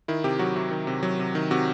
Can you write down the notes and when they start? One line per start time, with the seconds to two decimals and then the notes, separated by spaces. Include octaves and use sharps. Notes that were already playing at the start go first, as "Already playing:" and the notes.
0.08 D#3 E4
0.24 C3 G4
0.39 F#3 F#4
0.56 C3 F#4
0.71 D#3
0.87 C3
1.03 F#3
1.19 C3
1.35 D#3
1.51 C3 F#4